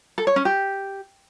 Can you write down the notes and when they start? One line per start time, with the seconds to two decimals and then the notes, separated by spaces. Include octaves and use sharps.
0.18 A4
0.27 C#5
0.36 C#4
0.45 G4